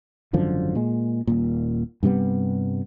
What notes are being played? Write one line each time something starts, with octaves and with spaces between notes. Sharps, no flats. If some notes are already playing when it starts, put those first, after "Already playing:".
G#1 F#2 D3 F3
A#2 G#3
D#1 A#2
G2 C3 G3 B3